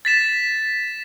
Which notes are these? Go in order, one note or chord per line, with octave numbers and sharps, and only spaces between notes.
A6 B6 E7